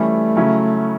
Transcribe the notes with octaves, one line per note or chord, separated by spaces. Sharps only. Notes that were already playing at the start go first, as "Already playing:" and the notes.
Already playing: E3 G3 A3 C#4 E4
C#3 F#3 C#4 E4